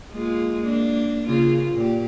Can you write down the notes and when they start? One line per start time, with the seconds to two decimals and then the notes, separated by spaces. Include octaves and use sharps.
0.12 G#3 A#3 F4
0.64 A#3 D4
1.27 C#3 A#3 F4
1.74 A#2 G4